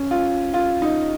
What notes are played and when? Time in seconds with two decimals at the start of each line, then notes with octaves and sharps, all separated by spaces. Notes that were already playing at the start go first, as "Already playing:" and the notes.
Already playing: C#4
0.11 F4
0.54 F4
0.82 D#4